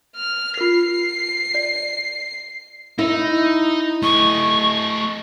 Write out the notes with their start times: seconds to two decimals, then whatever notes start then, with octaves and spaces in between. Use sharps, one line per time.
0.16 F6
0.57 F4 A#4 C7
1.55 D5
2.99 D#4 E4
4.03 A3 D#5 C#6